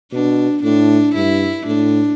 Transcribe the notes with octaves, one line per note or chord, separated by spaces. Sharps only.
B2 D4
A2 D4
G2 E4
A2 D4